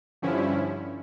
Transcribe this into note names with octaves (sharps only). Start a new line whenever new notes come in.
G2 D3 F3 C#4 E4